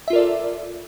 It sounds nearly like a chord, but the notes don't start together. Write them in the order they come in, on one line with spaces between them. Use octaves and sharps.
E5 F4 A#4 D5 A4